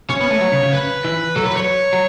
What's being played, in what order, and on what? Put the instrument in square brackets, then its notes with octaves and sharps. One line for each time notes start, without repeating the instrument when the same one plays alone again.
[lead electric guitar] C#4 [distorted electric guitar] C#5
[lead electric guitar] B3
A3
F#3
C#3
C#3
[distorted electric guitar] B4
[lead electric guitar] E3
[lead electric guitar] F#3 [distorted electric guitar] A4
[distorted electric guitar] B4
C#5
[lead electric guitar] F#3